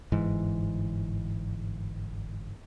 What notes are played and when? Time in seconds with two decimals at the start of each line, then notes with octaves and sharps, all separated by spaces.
0.12 G1 G#2 E3